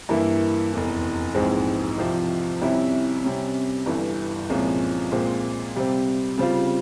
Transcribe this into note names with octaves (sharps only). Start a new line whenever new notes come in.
G2 E3 A#3 E4
F1 E2 E3
A#1 G#2 E3 G#3 C4
C2 C3 F3 C4 G4
C2 C3 G3 C#4 E4
C3 G3 C#4
G1 G2 E3
C2 A#2 F3 G#3 C#4
A#2 G#3 C4
C3 G3 C4
C#3 G3 C4 F4